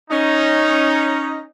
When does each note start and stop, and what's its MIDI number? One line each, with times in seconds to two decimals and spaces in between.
0.11 1.44 61
0.11 1.44 63